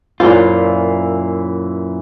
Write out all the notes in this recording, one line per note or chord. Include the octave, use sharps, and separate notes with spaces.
F#2 A#2 E3 E4 F4 C5